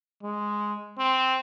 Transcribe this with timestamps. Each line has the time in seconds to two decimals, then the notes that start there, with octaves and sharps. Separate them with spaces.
0.23 G#3
0.98 C4